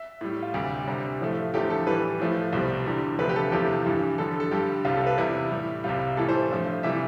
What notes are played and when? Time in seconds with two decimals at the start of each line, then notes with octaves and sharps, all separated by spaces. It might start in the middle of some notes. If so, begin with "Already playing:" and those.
Already playing: E5
0.21 A2 G3
0.43 F4
0.54 D2 C3 G3 G4
0.87 D2 C3 G3
1.20 A2 F3 A3
1.54 E2 D3 F3 A3 G4
1.70 A4
1.87 A2 E3 G3 B4
2.20 A2 F3 A3
2.52 C2 B2 G3 C5
2.86 E2 D3 G3
3.19 D2 C3 F3 A3 B4
3.29 G4
3.36 A4
3.52 E2 C3 F3 A3 G4
3.85 G2 E3 G3
4.18 F2 D3 G3 A4
4.40 A4
4.51 G2 D3 G3 G4
4.85 C2 C3 G3 F4
4.96 A4
5.07 B4
5.18 E2 C3 G3 E4
5.51 A2 G3
5.84 C2 C3 G3 F4
6.17 A2 E3 G3 A4
6.29 C5
6.50 G2 F3 A3
6.83 C3 E3 G3 E5